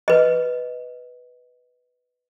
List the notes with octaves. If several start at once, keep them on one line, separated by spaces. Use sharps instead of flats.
B4 D#5